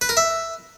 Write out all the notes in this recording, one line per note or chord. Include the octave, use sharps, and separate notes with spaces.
B4
A#4
E5